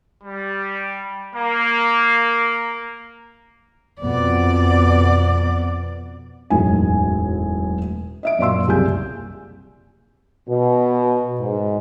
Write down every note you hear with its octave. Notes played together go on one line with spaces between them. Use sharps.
G3
A#3
F2 B2 B3 D5
E1 F#2 A2 D#4 G#5
D#5 E5 D7
F#2 A#2 D5 F5 C6 E6
F#1 C2 G4 G#4 G#5 G6
B2
G#2